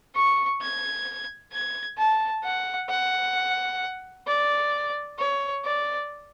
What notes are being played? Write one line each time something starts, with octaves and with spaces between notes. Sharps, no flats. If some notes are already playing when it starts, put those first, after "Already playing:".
C#6
G#6
G#6
A5
F#5
F#5
D5
C#5
D5